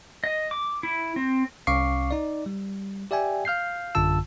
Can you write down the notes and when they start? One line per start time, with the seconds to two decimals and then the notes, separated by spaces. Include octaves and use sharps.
0.24 D#5
0.51 D6
0.83 E4
1.16 C4
1.67 C2 C#4 F5 C#6 D6 C7
2.11 D#4 D5
2.46 G3
3.11 G4 D5 E5 G5 G#5
3.45 F5 F6 G6 C7
3.95 A1 F#2 D3 F4 A5 E6